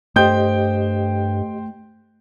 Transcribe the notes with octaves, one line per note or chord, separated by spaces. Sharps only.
G2 A3 G4 C5 D#5 G5 G6